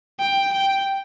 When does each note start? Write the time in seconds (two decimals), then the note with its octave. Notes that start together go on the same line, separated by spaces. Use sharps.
0.20 G5
0.53 G5